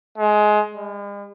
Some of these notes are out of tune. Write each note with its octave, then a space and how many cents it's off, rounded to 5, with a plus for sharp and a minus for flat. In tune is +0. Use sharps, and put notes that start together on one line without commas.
G#3 +20
G#3 -45